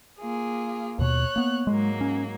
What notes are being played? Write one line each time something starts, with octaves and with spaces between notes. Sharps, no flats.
A#3 F4 G#4
D#2 B2 C#5 F#6
A#3 B3
G#2 F#3 G#3 A#3
C#4